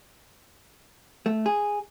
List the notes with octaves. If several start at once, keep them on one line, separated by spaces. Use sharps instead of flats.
A3
G#4